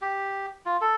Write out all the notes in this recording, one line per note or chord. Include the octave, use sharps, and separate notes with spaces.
G4
F4
A4